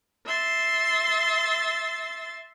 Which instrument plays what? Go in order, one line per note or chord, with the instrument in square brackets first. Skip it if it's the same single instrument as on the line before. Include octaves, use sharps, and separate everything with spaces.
[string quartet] E5 C6 A6